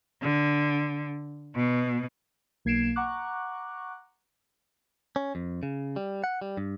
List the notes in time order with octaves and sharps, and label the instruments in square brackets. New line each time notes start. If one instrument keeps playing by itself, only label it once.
[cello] D3
B2
[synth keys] B1 A#3 G#6 C7 D7 E7
F#5 A#5 C#6 D6 F#6
[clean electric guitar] C#4
F2
C#3
G3
F#5
G3
G2